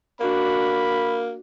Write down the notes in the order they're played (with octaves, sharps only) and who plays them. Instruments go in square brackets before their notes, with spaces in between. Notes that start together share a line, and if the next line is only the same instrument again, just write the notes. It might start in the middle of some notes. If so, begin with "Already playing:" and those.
[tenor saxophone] A#3 [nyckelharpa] D4 F#4 [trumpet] B5